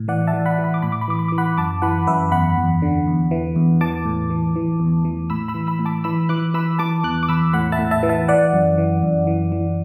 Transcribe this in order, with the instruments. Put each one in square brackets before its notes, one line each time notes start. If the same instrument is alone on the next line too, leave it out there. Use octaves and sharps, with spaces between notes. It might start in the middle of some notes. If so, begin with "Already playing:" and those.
Already playing: [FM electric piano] A2
E3 D5 F#5
E5 A5
E3
F#5 B5
E3
B5
D6
A2 B5
D6
B5
E3 D6
B5
E3 D6
F#5 B5
F#2 A5 D6
E3 F#5 B5
F#2 B4 E5
E2 F#5 B5
E2
D3
E2
E3
E2
E3 A5 D6
A2
E3
E3
E2
E3
A2 B5 E6
B5 E6
E3
B5 E6
A2
A5 D6
E3 B5 E6
E3 D6 F#6
E3 B5 E6
E3 A5 D6
E2 D6 F#6
D6
E2 B5 E6
A2 F#5 B5
E5 A5
A2
E5 A5
E3
E5 A5
E3 D5 F#5
F#2
E3
F#2
E3
E3